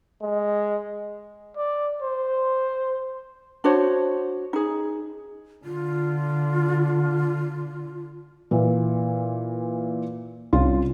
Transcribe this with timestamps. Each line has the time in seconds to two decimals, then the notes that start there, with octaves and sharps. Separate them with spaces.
0.23 G#3
1.57 D5
2.01 C5
3.64 D4 F#4 C5 C#5
4.53 D#4 G#4
5.65 D3 F4
8.51 A#2 E3
10.53 C2 C#4 F4